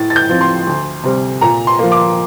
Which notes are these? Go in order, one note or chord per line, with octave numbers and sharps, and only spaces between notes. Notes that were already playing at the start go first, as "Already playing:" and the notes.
Already playing: A2 A6
A6
G6
F3 C4
C6
D2
C3 G3 C4
A#2 A#5
C6
F3 A#3
D6